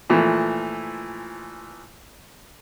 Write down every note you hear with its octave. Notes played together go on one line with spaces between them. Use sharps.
A#2 E3 F3 A3